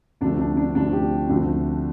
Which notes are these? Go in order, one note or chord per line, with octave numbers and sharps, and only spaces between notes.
D2 C3 F3 A3 D4
D4
D4
D2 C3 F3 A3 D4
G4
D2 C3 F3 A3 D4